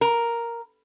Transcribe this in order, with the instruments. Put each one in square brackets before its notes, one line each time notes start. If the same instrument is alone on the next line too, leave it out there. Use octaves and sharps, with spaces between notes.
[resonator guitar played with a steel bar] A#4